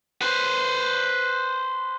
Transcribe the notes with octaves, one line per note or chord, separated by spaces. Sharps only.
B4 C5